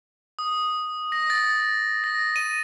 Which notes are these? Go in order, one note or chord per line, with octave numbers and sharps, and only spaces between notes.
D#6
A#6
A6
A#6
D#7